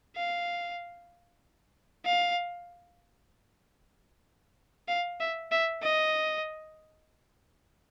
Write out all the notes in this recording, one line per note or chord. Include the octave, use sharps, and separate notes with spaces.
F5
F5
F5
E5
E5
D#5